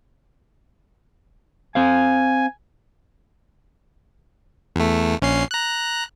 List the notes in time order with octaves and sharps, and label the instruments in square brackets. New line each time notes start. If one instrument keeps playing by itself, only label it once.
[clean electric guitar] C4 C5 F5 [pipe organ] G#5
[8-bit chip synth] E2 A3
A#1 C#4 C7
A#5 F#6